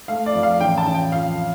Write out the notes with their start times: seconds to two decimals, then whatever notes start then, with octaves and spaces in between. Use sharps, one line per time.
0.08 A3 F5
0.26 D5
0.34 F2
0.43 F5
0.60 A1 G5
0.78 A5
0.87 A1
0.94 G5
1.12 F2 F5